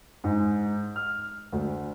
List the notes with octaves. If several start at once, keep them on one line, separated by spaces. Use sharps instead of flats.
G#2
F6
D2